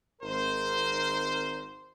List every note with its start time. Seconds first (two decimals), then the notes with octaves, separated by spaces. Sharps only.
0.22 G#1 A#4 C5